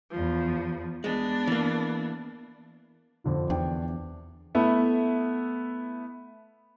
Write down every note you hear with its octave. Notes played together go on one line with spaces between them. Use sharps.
E2 F3
G#3 B3 D4
E3 A#3
F2 D3 F4
E2 D4 G5
A3 B3 E4